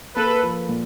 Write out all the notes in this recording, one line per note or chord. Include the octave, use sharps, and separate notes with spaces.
A#3 A4 B4
F3
A#2